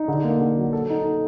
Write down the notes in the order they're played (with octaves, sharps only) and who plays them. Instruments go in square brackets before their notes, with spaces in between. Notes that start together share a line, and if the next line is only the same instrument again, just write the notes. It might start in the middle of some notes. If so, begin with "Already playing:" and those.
Already playing: [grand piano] D#4
D3
A#3
D3
F#3
A4
D#4
A4